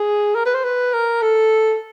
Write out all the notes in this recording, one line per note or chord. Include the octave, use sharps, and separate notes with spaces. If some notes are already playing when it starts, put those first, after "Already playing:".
Already playing: G#4
A#4
B4
C5
B4
A#4
A4